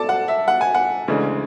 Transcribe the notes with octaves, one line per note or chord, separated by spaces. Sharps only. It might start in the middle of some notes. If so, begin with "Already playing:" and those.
Already playing: A4 D5 A5 D6
F#5
E5
F#5
G#5
F#5
D2 C#3 E3 G#3 D4